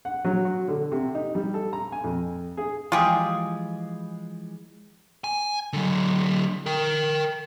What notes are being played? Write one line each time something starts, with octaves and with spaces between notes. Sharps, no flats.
F#5
F#3
F#4
D3
C3
D#4
G3
A4
A#5
G#5
F2
G#4
E3 F3 G#3 F4 G4 G#4
G#5
D3 F#3
A#4 G5